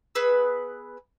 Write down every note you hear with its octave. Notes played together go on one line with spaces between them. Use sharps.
B3 G#4 B4 E6